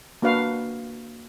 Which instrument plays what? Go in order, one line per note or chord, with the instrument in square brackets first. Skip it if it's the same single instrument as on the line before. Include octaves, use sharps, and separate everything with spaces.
[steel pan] A#3 D4 F#4 B4 F5